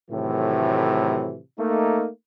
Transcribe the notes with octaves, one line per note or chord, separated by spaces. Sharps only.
A2 C3 D#3 E3 F#3 A3
A3 A#3 D#4